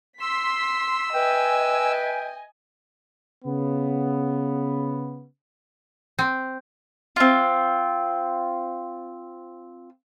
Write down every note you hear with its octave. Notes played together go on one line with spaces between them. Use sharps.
C6 E6 B6
B4 D#5 E5 G5 G#5
C#3 B3
C4
C4 F4